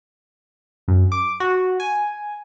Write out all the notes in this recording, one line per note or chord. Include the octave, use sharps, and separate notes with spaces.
F#2
D6
F#4
G#5